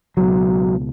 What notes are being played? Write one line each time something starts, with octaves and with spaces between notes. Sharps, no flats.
C#2 B2 F#3